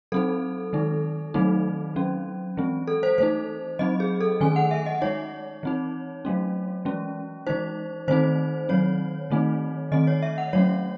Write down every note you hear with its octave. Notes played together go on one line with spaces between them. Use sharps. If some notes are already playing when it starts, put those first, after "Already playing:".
F#3 C4 D#4 A4
D#3 G#3 D#4
D#3 F#3 A3 C4 D#4
F#3 C#4
E3 G#3 C4
A4
C5
E3 A3 D#4 C5
F#3 C4 D#4 D#5
G#4
A4
D#3 A3 C#4 G#5
F#5
E5
D#5
G#3 D#4 C#5
E3 C4 D#4
F#3 A3 C#4
E3 G#3 C#4
E3 G#3 D#4 C5
D#3 A3 C4 D#4 C5
D#3 F#3 C4 C#5
D#3 A3 C4 D#4
D#3 A3 C4 D#5
C#5
E5
F#5
F#3 A3 C#4 C#5